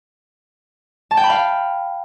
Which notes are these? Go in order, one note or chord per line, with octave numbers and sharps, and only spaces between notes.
A5
G5
B5
F5